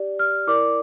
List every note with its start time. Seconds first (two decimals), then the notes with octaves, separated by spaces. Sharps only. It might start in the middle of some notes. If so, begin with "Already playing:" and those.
Already playing: G4 D5
0.19 F6
0.47 E4 A#4 D5 D6